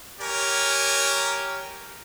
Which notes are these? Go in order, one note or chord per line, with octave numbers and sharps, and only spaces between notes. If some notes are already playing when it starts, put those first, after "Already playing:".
G4 A#4 C#5 G#5